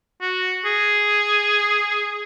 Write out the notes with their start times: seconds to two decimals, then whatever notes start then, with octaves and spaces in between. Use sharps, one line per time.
0.22 F#4
0.65 G#4